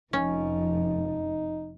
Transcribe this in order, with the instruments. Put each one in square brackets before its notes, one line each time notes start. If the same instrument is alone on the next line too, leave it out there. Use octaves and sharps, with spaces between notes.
[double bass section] F1 [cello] F3 [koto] C#4 [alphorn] D#4